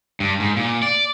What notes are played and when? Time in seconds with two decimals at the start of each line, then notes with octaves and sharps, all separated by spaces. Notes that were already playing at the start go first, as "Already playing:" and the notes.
0.20 G2
0.40 G#2
0.57 A#2
0.83 D5